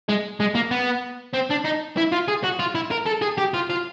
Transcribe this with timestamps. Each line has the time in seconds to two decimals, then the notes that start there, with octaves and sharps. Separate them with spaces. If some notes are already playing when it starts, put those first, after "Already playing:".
0.09 G#3
0.40 G#3
0.55 A#3
0.71 B3
1.33 C4
1.50 D4
1.64 D#4
1.97 E4
2.12 F4
2.28 G#4
2.44 F#4
2.59 F4
2.75 E4
2.91 A#4
3.06 A4
3.22 G#4
3.38 G4
3.54 F4
3.70 F4